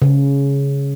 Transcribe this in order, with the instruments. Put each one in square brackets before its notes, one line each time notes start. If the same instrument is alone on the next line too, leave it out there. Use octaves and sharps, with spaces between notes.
[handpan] C#3